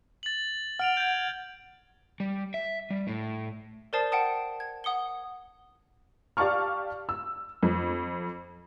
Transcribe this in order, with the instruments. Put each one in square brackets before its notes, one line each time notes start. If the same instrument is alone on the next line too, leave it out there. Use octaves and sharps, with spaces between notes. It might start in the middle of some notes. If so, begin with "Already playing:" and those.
[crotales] A6 F#7
[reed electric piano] F#5 [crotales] F6 D7 F7
[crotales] G6 G#6
[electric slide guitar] G3
E5
G3
A2
[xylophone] A#4 C5 D5 A5 D#6 C7
F#5 G5 A5 D#6
G#6
F#5 D#6 C#7 G7
[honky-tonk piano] G4 D5 F5 A5 C#6 F6
E6
F2